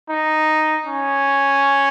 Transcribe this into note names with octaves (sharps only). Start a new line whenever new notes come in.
D#4
C#4